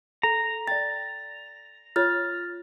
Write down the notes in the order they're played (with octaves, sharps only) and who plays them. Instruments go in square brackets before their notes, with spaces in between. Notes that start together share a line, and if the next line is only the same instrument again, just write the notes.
[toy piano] A4 [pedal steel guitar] A#5
[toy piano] D5 G5 [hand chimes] A6
[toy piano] F4 C#5 [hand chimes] F6 A6